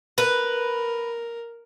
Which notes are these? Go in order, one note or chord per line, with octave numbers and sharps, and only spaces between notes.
A#4 B4